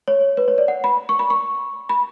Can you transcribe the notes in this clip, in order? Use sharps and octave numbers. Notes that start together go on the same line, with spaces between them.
C#5
B4
C#5
D5
F#5
B5
C#6
B5
C#6
B5